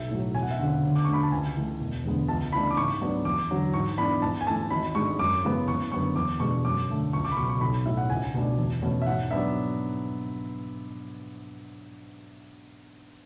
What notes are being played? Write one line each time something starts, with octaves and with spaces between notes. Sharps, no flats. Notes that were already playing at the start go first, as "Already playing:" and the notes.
Already playing: B1 E5
A2 F#3
E1 G#5
F#5
E5
D2 C#3 F#5
D2
D6
D3 A3 C#6
B5
A5
C#2 G#5
C#3 E3 A3
E1
E2 D3 G#3 B3
C#2 A5
C#3 E3 A3 D4 B5
D6
G#2 C#6
F#3 B3 D4
E2 D6
D3 F#3
G#2 C#6
E3 B3 D4 B5
G#2 A5
G#5
E3 A3 A5
G#1 B5
G#2 G#3 D4 C#6
F#2 D6
C#3 E3 G#3 B3
F#1 C#6
F#2 D3 F#3 B3 C#6
E2 D6
B2 G#3 D4 C#6
F#2 D6
D3 A3
C#2 C#6
D6
B5
B2 F#3 C#6
C#6
B1 B5
A2 F#3 E5
F#5
C#2 G#5
B2 A3 D4
E2
B2 A3 C#4
E5
G#2 F#5
F#3 B3 D4 E5